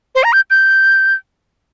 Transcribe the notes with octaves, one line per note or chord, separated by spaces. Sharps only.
C5
A#5
G6
G6